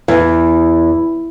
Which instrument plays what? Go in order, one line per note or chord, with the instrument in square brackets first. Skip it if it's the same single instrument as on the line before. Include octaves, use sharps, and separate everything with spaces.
[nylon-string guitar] E2